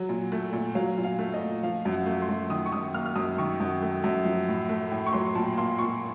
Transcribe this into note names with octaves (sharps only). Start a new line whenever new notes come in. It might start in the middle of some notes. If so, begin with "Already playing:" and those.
Already playing: F#3
A#2
A3
A#2
F#3 F5
A#2
F5
A3
D#5
A#2
F3 F5
F#2
F#5
A3
C6
F#2
D#3 D#6
C#6
F#2 D#6
A#3 F6
F6
F#2 D#6
D#3 C#6
F#2
A3
F#2
F3
A2
A3
A2
C#6
F#3 C6
A#2 A5
A#3 C6
A#2 C#6